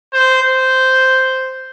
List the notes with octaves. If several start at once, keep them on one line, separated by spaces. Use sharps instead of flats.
C5
C5